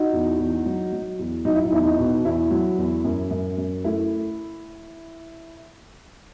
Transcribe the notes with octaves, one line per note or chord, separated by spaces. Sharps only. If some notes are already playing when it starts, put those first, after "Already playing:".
Already playing: D#4 F#4
E2
E2
F#3
F#3
E2
F#3 D#4
E4
D#4
E2 E4
D#4
B2
E2 E4
F#3
E2
F#2
F#2
F#2
A3 E4